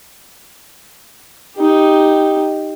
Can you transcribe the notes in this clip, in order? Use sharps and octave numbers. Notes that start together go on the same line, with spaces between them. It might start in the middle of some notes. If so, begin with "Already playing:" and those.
D#4 G4